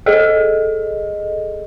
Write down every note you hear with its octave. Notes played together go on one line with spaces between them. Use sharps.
G#4 A4 D#5